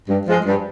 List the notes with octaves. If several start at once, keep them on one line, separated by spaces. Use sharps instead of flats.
G2
F3 G#3
G2